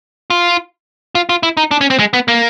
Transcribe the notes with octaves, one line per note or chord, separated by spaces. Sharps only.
F4
F4
F4
E4
D#4
D4
C#4
C4
G#3
B3
A#3